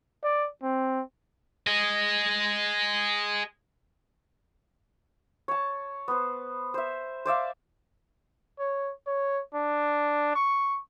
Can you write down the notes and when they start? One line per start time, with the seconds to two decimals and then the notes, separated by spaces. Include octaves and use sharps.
0.24 D5
0.63 C4
1.67 G#4 D#5
5.48 C#5 A5
6.08 B3 C5
6.74 C5 E5
7.25 C5 D5 E5 F5
8.59 C#5
9.07 C#5
9.54 D4
10.35 C#6